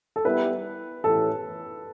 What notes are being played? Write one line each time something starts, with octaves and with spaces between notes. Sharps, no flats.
A4
G3 B3 E4 G4 B4
A2 E3 A3 C#4 G4 A4